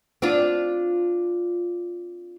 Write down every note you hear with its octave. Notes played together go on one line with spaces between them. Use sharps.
C4 D4 F4